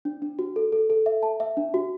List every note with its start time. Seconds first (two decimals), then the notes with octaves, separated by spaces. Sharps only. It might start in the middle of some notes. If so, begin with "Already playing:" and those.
0.05 D4
0.22 D4
0.39 F#4
0.56 A4
0.72 A4
0.90 A4
1.06 E5
1.23 A5
1.40 E5
1.57 D4
1.74 F#4